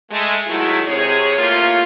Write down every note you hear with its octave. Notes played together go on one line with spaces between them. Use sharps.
G#3 A3
D#3 F#3 G#3 A3 E4
C3 G#4 C#5
A2 A#3 C#4 F4